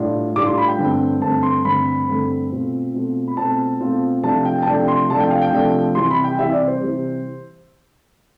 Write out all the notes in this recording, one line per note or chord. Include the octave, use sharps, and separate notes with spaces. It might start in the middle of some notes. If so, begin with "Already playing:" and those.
Already playing: A2 G3 D4 F4
A2 G3 D4 F4 D6
C6
B5
G5
G2 D3 A3 C4
G2 D3 A3 C4 A5
C6
G2 D3 A3 C4 B5
G2 D3 A3 C4
B2 A3 C4 F4
B2 A3 C4 F4
B5
B2 A3 C4 F4 A5
B2 A3 C4 F4
C3 F3 A3 D4 A5
G5
A5
C3 F3 A3 D4 G5
C6
C3 F3 A3 D4 A5
G5
F5
G5
C3 F3 A3 D4
C3 E3 G3 C6
B5
G5
C3 E3 G3 E5
D5
C5
C3 E3 G3